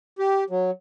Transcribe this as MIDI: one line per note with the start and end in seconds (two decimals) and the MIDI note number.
0.19 0.44 67
0.50 0.71 54